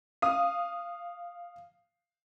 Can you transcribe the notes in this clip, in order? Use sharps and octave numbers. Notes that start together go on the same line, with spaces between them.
F5 D#6